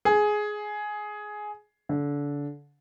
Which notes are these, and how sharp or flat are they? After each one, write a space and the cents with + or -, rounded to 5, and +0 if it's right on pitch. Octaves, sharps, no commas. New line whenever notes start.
G#4 +10
D3 -30